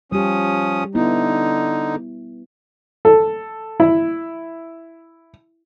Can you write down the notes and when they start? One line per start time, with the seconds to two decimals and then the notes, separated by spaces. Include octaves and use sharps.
0.12 F3 G3 C#4 G4 D#6
0.95 D3 B3 D#4 E4
3.05 A4
3.80 E4